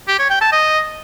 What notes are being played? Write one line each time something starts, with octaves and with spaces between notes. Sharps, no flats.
G4
C#5
G5
A5
D#5